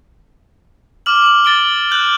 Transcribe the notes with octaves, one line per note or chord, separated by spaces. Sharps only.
D6 F6 F#7
D6 F#7
A6 D7 G7
F#6 G6 F#7